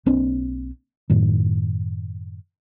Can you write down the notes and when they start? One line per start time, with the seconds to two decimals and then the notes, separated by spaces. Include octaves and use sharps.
0.06 B1 A#3 C4 D4
1.10 F#2 A2 D#3